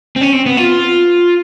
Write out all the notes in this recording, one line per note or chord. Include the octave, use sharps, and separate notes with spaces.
C4
C#4
C4
B3
F4